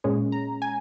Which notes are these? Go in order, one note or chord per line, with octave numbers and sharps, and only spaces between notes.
A#2 G#3 C#4
A#5
G#5